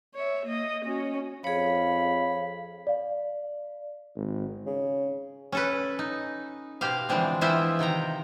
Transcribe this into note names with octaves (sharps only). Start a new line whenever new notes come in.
C#5 E5
A#3 D#5
C#4 F#4
F2 G#4 C#5 F5 B5
D5 F5
G#1
C#3
C#4 A4 B4
D#4
B2 G4 C5 F5
D3 E3 F3 G#3 C4 D4
E3 B3 E4 F4 C5 E5
C3 D#3 G5 A#5